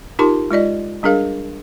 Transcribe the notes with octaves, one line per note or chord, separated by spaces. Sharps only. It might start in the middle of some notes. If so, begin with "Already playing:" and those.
D#4 F4 G4 A#4 A5 C6
G#3 F4 D5 D#5
G3 D4 G#4 A#4 F5